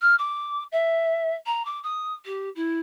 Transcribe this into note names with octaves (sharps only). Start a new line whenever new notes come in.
F6
D6
E5
A#5
D6
D#6
G4
E4